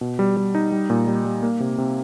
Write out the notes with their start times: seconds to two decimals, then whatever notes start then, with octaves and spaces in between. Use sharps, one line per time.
0.01 B2
0.19 G3
0.37 G3
0.55 D#4
0.72 G3
0.90 A#2
1.07 G3
1.25 G3
1.43 A#3
1.60 C3
1.78 C3